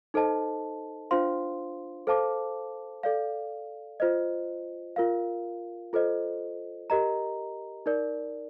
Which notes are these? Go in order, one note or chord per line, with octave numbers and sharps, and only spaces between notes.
D#4 A4 C5 D#5 A5
D4 F4 C5 F5 C6
A4 C5 F5 A5 D6
A4 D5 F5
F4 C5 D#5
F4 A#4 F5
F4 A4 C5 D#5
G4 A#4 D#5 A#5
D#4 A#4 D5